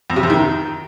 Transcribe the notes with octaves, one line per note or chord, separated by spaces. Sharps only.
F2
C3
F2
D#3